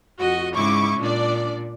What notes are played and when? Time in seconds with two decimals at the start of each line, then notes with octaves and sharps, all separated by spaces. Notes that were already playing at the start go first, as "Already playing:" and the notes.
0.20 F2 F#4 D#5
0.55 G#2 C#3 G#3 E4 C#6 D6
0.99 A#2 D4 D5